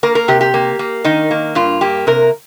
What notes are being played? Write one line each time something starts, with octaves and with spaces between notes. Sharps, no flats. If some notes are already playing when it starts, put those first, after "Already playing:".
A#3 A#4
A#4
C3 G4
G4
A#3
A#3
D#3 D#4
A#3
G2 F4
A#3 G4
C3 A#4